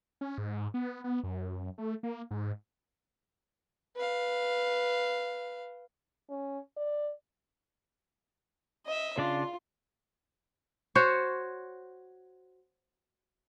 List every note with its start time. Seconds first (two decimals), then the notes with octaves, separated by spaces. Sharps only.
0.21 C#4
0.38 G#2
0.74 B3
1.04 B3
1.24 F#2
1.78 A3
2.03 A#3
2.31 G#2
3.96 B4 F5
6.30 C#4
6.77 D5
8.86 D#5 E5
9.18 C#3 D4 F4 D5
10.95 F#4 C5 C#5